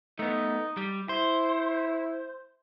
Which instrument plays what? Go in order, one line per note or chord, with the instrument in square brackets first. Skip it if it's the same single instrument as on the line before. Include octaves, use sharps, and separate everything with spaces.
[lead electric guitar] A3 B3 [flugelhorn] D#4
[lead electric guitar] G3
[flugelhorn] E4 [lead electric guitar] C5